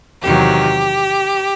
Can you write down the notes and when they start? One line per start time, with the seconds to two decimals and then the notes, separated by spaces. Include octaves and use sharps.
0.23 E2 C3 D#3 F#3 G4